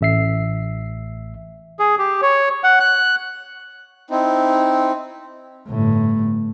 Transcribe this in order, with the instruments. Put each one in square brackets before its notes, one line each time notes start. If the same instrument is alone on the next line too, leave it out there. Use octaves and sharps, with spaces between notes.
[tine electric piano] A1 E5 C7
[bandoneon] G#4
G4
C#5
F#5
F#6
[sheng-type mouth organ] C4 D#4 E4
[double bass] G1 A2